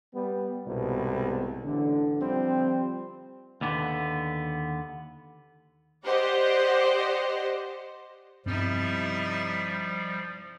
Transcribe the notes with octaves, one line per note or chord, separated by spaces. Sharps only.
G3 B3
C2 G#2 B2
A1 D3
F3 G3 C4
D#2 D3 B3
G4 C5 D5 D#5 F#5
G2 C3 F3 G3 B3 C4 D#4 E4